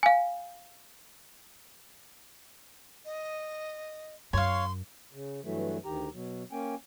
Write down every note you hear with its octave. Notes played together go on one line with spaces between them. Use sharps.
F5 G#5
D#5
F#2 C#5 F5 C6
C#3
G2 E3 F#3 A3
D2 D#3 G4 A#5
B2 F#3
A#3 C#4 G5 G#5